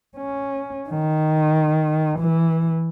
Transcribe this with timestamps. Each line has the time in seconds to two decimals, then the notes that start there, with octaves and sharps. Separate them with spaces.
0.18 C#4
0.89 D#3
2.20 E3